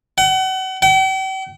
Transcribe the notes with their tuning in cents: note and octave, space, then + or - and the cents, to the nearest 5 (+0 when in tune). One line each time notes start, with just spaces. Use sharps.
F#5 +35
G5 -45